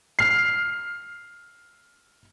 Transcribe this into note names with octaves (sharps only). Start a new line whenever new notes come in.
F6 C7